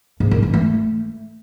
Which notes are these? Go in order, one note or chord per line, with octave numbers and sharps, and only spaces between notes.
G#2
D#3
E3
A3